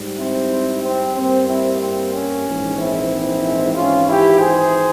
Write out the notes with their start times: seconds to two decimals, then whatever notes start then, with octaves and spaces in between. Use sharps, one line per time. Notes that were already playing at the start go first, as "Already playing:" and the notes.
Already playing: G#2 G3
0.18 C4 E4
0.83 C4
1.16 G2 G3 A#3 C4
1.48 C4 E4
1.80 C4
2.13 C#4
2.45 A#1 G#2 E3 G#3
2.77 C4 E4
3.75 G#1 G#2 E3 C#4 F4
4.08 E4 G4
4.40 G#4 C5